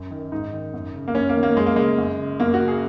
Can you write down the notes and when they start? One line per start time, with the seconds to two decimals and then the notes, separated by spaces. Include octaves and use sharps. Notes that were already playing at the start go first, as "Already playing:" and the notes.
Already playing: F#2
0.11 D#3
0.32 G#2 D#4
0.53 D#3
0.74 F#2
0.94 C#3
1.08 A#3
1.15 F#2 C#4
1.29 A#3
1.36 D#3
1.43 A#3
1.56 F#2 G#3
1.66 A#3
1.76 C#3 G#3
1.98 F#2
2.19 C#3
2.40 F#2 A#3
2.54 F#4
2.61 C#3
2.68 G#4